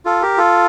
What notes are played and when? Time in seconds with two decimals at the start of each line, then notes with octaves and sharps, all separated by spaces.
0.05 F4 A4
0.22 G4 A#4
0.38 F4 A4